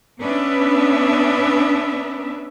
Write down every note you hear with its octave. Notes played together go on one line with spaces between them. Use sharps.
B3 C#4 D4 B4 E5